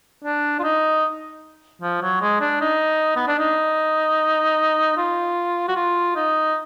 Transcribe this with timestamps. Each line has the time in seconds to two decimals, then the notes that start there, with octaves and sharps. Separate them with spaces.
0.24 D4
0.59 F4
0.63 D#4
1.82 F3
2.01 F#3
2.21 G#3
2.41 D4
2.61 D#4
3.16 B3
3.28 D4
3.39 D#4
4.97 F4
5.68 F#4
5.76 F4
6.15 D#4